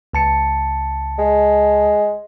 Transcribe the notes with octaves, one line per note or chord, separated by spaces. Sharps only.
C#2 A5 C#7
G#3